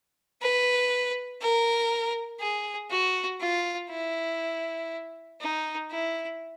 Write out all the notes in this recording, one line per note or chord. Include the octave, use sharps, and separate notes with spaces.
B4
A#4
G#4
F#4
F4
E4
D#4
E4